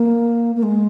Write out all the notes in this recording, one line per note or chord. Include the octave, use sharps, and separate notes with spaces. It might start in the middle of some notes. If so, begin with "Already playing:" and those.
Already playing: A#3
A#3
G#3